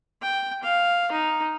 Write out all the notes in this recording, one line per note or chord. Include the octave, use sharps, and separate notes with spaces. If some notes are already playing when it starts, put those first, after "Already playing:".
G5
F5
D#4